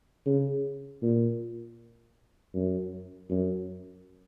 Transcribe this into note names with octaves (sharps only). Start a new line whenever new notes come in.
C#3
A#2
F#2
F#2